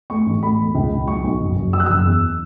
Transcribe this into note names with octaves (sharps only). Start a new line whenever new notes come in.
A3 C#6
A1
A3 B5
E1
C#2
C#2
B1 C#6
B1
F#1
F#1
F#3 E6
F#6
F#1 E6
E2